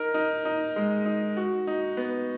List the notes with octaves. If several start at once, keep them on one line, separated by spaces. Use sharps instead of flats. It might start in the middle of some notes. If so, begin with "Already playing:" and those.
Already playing: D#4 A#4
D#4
D#4
G#3
D#4
F#4
D#4
B3